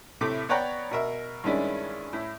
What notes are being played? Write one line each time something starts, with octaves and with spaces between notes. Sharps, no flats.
A2 C3 A3 D6
B3 C#5 D5 F#5 G5 A#5
B2 A#4 E5
G2 D#3 G#3 C#4 E4 D5
A2 E4